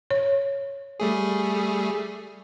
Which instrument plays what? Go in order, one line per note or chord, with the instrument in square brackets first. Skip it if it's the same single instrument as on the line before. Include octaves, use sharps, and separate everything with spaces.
[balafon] C#5
[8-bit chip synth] G3 A3 G#4